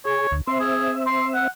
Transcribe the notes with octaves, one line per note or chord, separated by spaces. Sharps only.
G#4 C#5
D2
C4 E5 C6
G#4
C6
F#5